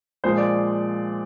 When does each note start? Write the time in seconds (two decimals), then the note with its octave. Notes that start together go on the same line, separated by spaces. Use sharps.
0.24 A#2 F3 G#3 C5
0.38 D5